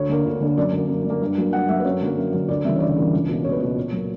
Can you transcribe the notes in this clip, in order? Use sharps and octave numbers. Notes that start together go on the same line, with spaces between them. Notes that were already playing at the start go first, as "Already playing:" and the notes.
Already playing: D2 C#5
D3 A#3
D2
D3 A#3
F#2 D5
D3 A#3
F#2
D3 A#3
G2
F#3 A#3
G2 F#5
F#3 A#3 E5
B4
F#2 C#5
D3 F#3 A#3
F#2
D3 F#3 A#3
D2 D5
C#3 E3 G3 A#3 E5
C#5
D2 D5
C#3 E3 G3 A#3
C#2
B2 A#3
C#2 C#5
B4
B2 A#3 C#5
A#2
F#3 A#3